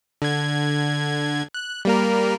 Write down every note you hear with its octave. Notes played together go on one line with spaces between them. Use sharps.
D3 G#6
F#6
G3 A#3 A#4